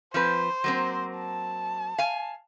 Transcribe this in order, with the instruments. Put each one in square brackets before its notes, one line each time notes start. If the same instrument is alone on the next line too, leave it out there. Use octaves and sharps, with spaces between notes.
[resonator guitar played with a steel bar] F3 C4 B4 [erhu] C5
[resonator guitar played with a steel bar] F#3 A#3 C4
[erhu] A5
[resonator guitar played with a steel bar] F5 G#5